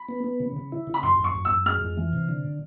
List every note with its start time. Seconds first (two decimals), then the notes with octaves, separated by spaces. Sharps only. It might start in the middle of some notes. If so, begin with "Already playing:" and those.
Already playing: B5
0.09 B3
0.24 B3
0.40 C#3
0.56 C#3
0.72 E4
0.87 C#3
0.94 B5
1.03 F#2 C6
1.19 F#2 C#6
1.35 F#2
1.45 E6
1.51 F#2
1.66 G#3 F6
1.82 F2
1.97 E3
2.13 C3
2.29 D3